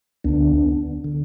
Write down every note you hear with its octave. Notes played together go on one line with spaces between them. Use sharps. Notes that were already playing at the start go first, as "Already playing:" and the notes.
D2 D3 B3 D4
D3